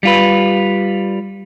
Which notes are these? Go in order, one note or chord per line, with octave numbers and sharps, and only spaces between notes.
G3 F4 B4